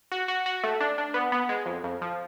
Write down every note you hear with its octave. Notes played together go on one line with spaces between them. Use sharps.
F#4
F#4
F#4
A3
D4
D4
B3
B3
G#3
F2
F2
F3